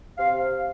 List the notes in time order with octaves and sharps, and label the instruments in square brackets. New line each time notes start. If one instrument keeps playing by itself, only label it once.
[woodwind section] C3 F5